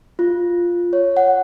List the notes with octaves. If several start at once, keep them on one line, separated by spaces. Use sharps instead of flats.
F4
C#5
F#5